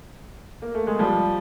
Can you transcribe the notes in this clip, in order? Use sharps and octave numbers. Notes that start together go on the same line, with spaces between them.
A#3
A3
G#3
F3 G3